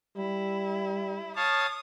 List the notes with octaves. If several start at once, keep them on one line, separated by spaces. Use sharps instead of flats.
G3 E4
C#5 F5 A5 D#6